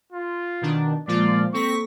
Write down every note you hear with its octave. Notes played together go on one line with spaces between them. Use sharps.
F4
B2 D#3 D4
A#2 F3 G#3 A#3 F4 D5
A#3 C4 A4 C#6 A#6 B6